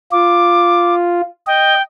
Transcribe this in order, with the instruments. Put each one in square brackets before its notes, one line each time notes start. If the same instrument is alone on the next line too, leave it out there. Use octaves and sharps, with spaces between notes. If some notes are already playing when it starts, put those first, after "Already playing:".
[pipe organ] F4 [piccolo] D6
[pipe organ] D#5 [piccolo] G5